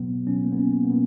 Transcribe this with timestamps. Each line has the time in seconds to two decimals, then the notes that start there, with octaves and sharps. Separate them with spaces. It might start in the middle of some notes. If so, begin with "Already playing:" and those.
Already playing: B2 F#3 B3
0.27 B2 F#3 C#4
0.44 A#3
0.52 B3
0.58 C#4
0.84 A#3
0.89 B2 F#3 B3